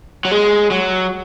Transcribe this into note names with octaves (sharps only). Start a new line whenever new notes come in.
F#3
G#3
F#3